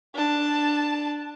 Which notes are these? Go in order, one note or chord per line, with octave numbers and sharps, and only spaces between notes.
D4 A5